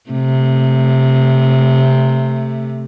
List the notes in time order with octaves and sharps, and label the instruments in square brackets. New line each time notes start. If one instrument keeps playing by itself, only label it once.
[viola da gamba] C3 A3